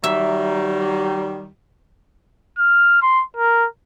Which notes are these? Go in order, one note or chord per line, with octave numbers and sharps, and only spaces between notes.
D#3 F#3 G3 E5
F6
C6
A#4